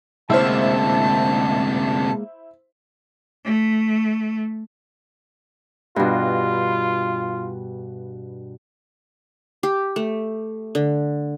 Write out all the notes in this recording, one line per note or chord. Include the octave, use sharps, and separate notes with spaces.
D2 C3 G#3 A#3 E4 C5 A5 F6
A3
G2 B2 F4
G4
A3
D3